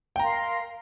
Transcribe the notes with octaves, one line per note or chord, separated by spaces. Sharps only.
G5
A#4 F5 A#5 C6